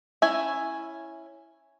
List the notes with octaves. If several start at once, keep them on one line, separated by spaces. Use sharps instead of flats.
C#4 E4 E5 G#5